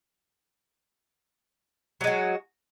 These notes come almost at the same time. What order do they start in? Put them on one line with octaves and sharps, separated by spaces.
F#3 G#3 F#4